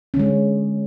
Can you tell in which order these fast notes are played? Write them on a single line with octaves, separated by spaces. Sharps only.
C#4 D3 G#3